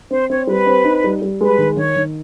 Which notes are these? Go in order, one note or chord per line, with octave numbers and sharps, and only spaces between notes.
C4 C5
C4 C#5
G3 B4
C4
D#4
G3
G3
G#3 B4
D#3
D#3 C#5
D#3